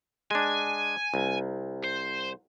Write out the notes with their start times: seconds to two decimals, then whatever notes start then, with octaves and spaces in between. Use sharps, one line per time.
0.31 G#3 D4 G#5
1.14 C2
1.84 C5